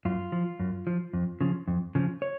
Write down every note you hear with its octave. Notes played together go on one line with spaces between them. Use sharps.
F#2 F4
F3
F#2
F3
F2
C#3 F3
F2
C#3 F3
C#5